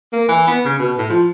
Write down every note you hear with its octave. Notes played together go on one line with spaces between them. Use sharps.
A#3
E3
B3
C#3
B2
A2
F3